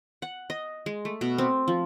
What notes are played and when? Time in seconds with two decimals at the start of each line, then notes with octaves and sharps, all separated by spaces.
0.22 F#5
0.50 D#5
0.86 G#3
1.05 A3
1.21 B2
1.38 C4
1.68 F3